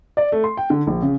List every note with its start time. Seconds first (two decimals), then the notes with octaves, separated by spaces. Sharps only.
0.17 D5
0.32 A3
0.44 C6
0.57 G5
0.70 D3
0.87 A#1
1.02 C#3